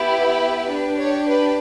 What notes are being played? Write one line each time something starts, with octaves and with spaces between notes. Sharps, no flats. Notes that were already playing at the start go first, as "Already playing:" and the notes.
Already playing: B3 E4 G4
B4
D4 G4
C#5
B4